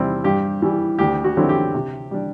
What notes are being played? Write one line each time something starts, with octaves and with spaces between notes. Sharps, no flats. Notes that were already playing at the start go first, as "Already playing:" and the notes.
Already playing: E2 C3 G3 C4 E4
G2 G4
E3 G3
D2 G4
F#4
D3 F#3 C4 E4
G4
C3
G3 D4